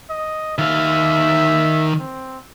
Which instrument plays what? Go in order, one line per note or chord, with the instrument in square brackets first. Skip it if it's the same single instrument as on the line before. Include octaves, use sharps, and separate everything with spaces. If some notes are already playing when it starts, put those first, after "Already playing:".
[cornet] D#5
[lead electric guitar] D#3 F5 [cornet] E5
[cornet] C4